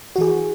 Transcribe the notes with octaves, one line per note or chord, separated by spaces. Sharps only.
E3 F#4 G#4